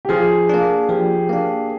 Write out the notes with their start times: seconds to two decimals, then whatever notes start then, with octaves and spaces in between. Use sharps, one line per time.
0.05 G4
0.09 F3 G#4
0.49 A#3 D4
0.89 F3 G4
1.29 A#3 D4